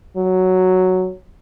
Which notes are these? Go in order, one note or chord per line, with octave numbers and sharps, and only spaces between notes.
F#3